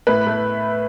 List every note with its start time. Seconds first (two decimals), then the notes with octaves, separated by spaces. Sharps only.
0.07 A2 B4
0.27 A3